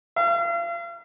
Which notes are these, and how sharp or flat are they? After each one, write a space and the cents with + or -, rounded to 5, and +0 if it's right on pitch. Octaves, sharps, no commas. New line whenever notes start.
F5 -40